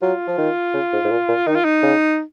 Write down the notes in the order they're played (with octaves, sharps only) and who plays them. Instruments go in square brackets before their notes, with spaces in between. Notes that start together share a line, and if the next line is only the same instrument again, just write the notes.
[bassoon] F#3 [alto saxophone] F4
[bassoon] F3
D#3
C#3
G#2
G#2
A#2
A#2
[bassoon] D#3 [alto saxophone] D#4
[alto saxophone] F4
D#4
[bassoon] C#3